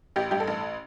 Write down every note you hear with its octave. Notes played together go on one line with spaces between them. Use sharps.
A1 G4
G2 G4
A4
A1